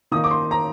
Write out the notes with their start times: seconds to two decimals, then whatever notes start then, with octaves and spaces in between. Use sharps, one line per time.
0.11 D#3 A#3 D#4 D#6
0.24 D6
0.31 C6
0.51 A#5